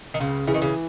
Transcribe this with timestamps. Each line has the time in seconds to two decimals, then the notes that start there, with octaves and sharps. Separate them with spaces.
0.14 D#3
0.20 C#2 C#3
0.47 C#3 E3
0.54 D#3
0.62 C#3